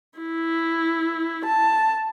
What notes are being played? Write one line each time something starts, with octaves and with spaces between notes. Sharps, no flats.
E4
A5